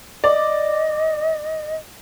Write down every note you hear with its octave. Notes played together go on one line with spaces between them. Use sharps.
D5 D#5